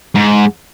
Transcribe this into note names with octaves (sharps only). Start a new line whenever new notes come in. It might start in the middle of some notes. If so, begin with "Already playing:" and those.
G#2